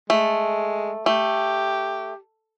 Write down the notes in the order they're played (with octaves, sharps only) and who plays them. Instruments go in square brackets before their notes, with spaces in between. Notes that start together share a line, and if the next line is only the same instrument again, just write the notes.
[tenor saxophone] G#3 [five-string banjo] A3
[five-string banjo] A3 [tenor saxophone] G4